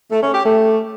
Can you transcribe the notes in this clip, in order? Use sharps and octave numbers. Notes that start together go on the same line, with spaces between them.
A3
C#4
G4
A3